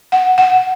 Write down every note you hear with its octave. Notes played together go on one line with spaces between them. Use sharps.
F#5
F#5